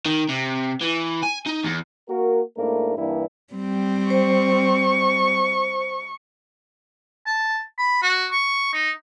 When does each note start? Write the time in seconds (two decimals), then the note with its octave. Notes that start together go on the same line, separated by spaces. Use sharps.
0.06 D#3
0.29 C3
0.81 E3
1.23 G#5
1.46 D#4
1.63 E2
2.09 A#3 F#4 A#4
2.58 G#2 A3 A#3 D4 E4 A#4
2.98 G2 E3 G3 A#3 D4 E4
3.54 G3 C4
4.10 C5 C#6
7.26 A5
7.78 B5
8.02 F#4
8.31 C#6
8.73 D#4